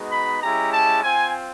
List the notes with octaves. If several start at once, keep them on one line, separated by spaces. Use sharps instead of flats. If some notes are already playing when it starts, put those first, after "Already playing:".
Already playing: G#3 B3 D#4 F#4
B5
G#3 C#4 E4 G4 A#5
A5
C4 F4 G#5